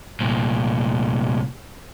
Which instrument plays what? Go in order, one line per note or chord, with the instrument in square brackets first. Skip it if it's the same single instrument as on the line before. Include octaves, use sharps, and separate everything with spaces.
[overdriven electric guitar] C2 A#2